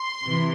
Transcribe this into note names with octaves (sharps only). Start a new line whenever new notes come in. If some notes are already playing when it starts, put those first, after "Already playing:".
Already playing: C6
C3 E3